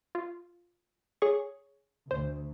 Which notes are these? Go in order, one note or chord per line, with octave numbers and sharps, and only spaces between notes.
F4
G#4 C#5 C#6
D2 C5